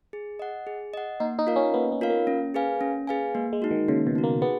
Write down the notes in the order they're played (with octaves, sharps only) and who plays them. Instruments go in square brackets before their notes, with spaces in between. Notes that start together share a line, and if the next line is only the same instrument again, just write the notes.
[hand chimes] G#4
D#5 F#5
G#4
D#5 F#5
[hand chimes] A#3 [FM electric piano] D#4
[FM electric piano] D#4
[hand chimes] F4 A#4 F5
[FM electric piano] C#4
[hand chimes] A#3 [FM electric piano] B3
[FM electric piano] B3
[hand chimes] F4 A#4 F5
[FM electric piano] A#3
[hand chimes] C#4
G#4 B4 F5 G#5
C#4
G#4 B4 F5 G#5
[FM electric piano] G#3 [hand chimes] A#3
[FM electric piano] G#3
[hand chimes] D#4 F#4
[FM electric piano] D#3
[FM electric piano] C#3 [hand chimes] A#3
[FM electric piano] B2
[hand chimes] D#4 F#4
[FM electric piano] A#3
[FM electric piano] B3 [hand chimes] G#4